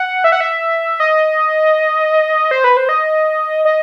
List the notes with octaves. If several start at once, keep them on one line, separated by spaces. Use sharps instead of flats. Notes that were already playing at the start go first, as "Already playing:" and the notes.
Already playing: F#5
E5
F#5
E5
D#5
C5
B4
C5
D#5
D#5